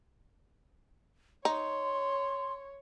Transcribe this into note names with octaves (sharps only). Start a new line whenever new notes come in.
D#4 C#5 C6